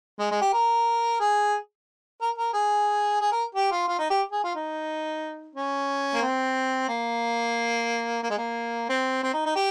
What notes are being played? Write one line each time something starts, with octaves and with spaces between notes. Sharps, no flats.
G#3
G#3
G4
A#4
G#4
A#4
A#4
G#4
G#4
A#4
G4
F4
F4
D#4
G4
G#4
F4
D#4
C#4
A#3
C4
A#3
A#3
G#3
A#3
C4
C4
D#4
D#4
G4